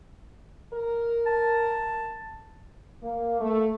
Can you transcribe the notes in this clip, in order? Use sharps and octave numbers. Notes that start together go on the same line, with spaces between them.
A#4
A5
A#3
A3